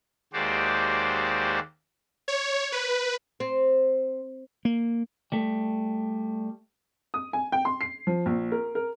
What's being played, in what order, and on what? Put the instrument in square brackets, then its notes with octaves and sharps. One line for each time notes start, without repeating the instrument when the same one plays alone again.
[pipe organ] D#2 G#3 F#4 G4 C5 D5
[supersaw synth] C#5
B4
[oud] C4
[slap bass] A#3
[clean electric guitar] G3 A3
[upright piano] D#6
G#5
G5
C6
C7
F3
A#1
A#4
A#4